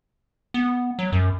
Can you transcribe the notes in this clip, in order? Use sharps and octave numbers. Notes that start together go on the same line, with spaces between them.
B3
F#3
F#2